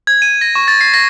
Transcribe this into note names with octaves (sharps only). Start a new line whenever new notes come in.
G#6
D#7
A#6
C#6
A6
C7
A#6